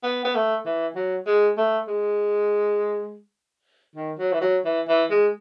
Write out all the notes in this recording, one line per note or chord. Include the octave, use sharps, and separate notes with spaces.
B3
B3
A3
E3
F#3
G#3
A3
G#3
D#3
F#3
E3
F#3
E3
E3
G#3